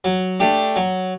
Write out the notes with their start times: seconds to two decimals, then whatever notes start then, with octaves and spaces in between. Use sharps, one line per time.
0.04 F#3
0.40 A3 D4 G4
0.76 F#3